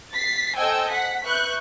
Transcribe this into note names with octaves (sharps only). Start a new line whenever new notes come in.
A6 B6 C7
A4 C5 D#5 G5 G#5 E6
F#5 B6
B4 E5 C#6 F#6 G6